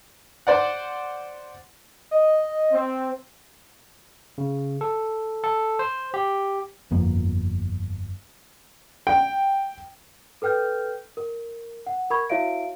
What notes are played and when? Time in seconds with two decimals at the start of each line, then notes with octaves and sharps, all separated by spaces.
0.47 C5 D5 F#5
2.11 D#5
2.72 C4
4.38 C#3
4.81 A4
5.44 A4
5.79 C5
6.14 G4
6.91 G1 F2 F3 A#3
9.07 G5
10.42 A4 B4 G5 F6 G6
11.17 A#4
11.86 F#5
12.11 A#4 B5 C#6 G#6
12.30 E4 F#4 C#5 E5 F5 D7